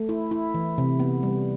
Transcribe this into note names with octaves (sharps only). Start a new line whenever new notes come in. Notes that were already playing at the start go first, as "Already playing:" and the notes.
Already playing: A3
E4
E4
E3
C3
B3
G3